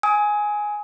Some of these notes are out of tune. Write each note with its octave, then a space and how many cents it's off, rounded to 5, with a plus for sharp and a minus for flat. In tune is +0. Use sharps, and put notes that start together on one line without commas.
G#5 +5 D#6 +35